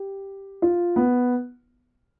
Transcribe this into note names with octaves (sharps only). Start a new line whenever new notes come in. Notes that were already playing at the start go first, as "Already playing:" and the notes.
Already playing: G4
F4
B3